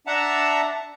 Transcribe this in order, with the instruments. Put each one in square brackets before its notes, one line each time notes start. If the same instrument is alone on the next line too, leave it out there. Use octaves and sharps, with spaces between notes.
[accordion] D4 E5 F#5 A5 A#5